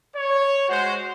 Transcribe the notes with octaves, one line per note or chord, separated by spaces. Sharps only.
C#5
G#3 F#4 C5